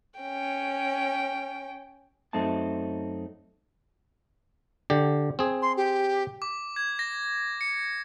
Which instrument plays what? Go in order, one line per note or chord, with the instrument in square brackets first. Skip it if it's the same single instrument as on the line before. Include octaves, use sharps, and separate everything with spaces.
[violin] C#4 G5
[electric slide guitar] F#2 A3 C4 D#4 A5
[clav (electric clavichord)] D3 G4
C4 G#4
[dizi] C6
G4
[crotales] D6
G#6
A#6
C#7